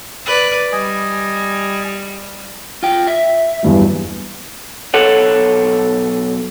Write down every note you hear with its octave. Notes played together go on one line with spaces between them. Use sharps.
B4 D5
G3 D#5 G#5
F4 G5
E5
E2 G2 F#3
B1 A4 C#5 F#5